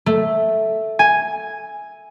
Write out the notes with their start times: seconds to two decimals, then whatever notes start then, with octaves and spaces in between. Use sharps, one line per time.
0.06 A3
0.99 G#5